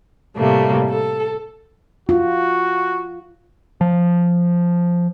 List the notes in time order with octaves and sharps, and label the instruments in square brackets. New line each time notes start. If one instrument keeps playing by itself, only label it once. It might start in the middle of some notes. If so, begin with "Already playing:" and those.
[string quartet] A2 C3 G3 A3 A#3
A4
[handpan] F4 [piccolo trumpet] F#4
[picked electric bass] F3